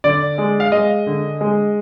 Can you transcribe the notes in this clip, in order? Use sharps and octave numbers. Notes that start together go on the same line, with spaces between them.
D3 D5
G#3
F5
G#3 D#5
D3
G#3